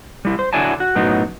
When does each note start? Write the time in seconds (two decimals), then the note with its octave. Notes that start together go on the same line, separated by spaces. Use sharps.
0.25 G3 E4
0.39 C5
0.53 D3 F#3 E4 D5 G#5 A5
0.80 F#4
0.95 F#2 A2 F#3 B3 D#4